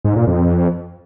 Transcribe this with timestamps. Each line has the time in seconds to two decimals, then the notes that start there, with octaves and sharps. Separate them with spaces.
0.04 G#2
0.16 A#2
0.27 F2